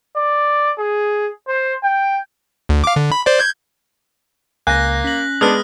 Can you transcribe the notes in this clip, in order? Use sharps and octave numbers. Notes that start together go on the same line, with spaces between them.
D5
G#4
C5
G5
D2
F5 D6
D3
B5
C5 D5
G6 G#6
C#2 C#3 A#3 G#5 F#6 A#6
C#4 B6 F#7
G#3 B3 D4 D#6 F6